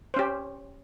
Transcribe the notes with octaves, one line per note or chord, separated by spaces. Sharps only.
C#4 G4 C5